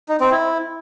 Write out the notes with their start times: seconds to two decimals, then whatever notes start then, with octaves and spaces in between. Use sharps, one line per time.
0.09 D#4
0.20 C4
0.32 E4